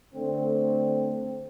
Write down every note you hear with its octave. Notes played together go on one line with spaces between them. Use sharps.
D3 A3 C4